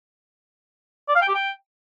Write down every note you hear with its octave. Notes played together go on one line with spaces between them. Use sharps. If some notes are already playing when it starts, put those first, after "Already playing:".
D5
F5
G5
G4
G5